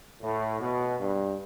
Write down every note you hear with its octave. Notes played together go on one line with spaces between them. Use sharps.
A2
B2
G2